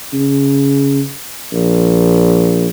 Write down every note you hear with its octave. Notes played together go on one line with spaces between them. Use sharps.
C#3
A#1